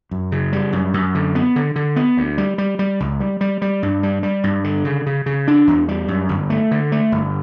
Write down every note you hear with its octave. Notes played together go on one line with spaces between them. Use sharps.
F#2
C#3
G3
F#2
F#2
D3
B3
D3
D3
B3
D2
G3
G3
G3
C#2
G3
G3
G3
G2
G3
G3
G2
D3
C#3
C#3
C#3
D4
E2
G3
F#2
G1
A3
D3
A3
G1